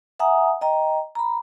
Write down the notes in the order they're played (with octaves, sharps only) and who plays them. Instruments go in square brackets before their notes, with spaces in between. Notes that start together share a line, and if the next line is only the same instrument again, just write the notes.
[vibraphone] E5 F#5 G#5 A#5 D#6
D#5 G5 A#5
A#5 B5